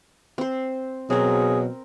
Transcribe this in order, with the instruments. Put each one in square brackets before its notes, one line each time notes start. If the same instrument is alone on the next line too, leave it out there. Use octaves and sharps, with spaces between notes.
[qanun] C4 C5
[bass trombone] B2 [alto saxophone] F#3 [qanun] C4 A#4 [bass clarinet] G#4